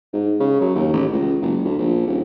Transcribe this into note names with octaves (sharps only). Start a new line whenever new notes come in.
G#2
C#3
F#2
D#2
A1
C#2
F#1
D2
A#1
D#1